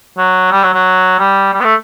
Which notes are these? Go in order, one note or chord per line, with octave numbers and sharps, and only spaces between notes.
F#3
G3
F#3
F#3
G3
G3
B3
A3